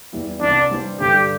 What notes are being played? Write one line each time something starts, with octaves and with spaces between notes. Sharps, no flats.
E2 E3 G3 E4
C2 C3 E3 D4
E3 G3 D4 C5
G2 D3 G3 G4